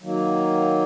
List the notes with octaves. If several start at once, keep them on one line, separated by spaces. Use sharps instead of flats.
D#3 F#3 A#3